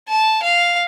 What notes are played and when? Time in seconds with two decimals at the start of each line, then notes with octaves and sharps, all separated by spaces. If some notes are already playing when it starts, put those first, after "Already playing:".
0.09 A5
0.43 F5